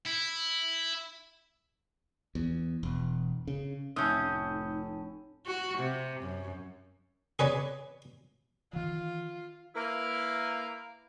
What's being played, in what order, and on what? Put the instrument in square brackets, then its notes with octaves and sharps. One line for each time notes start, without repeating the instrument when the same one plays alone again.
[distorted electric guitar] E4
[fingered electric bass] E2
E1
C#3
[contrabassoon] F1 [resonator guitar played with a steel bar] A2 C#4 [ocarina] D#4 [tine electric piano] D#6 G6
[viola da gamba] F#4
C3
F#2
[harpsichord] G#4 B4 C#5 D5
[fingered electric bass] D#3 E3 [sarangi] F4
[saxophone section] A#3 E4 A#4 B4